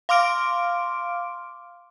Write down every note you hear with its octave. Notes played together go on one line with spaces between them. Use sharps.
F5 C6 D6 F6 D7